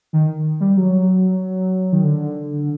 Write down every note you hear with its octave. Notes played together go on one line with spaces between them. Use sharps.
D#3
G3
F#3
D#3
D3